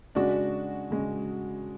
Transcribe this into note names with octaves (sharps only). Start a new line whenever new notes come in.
C#3 G#3 D4 F#4
C#3 G#3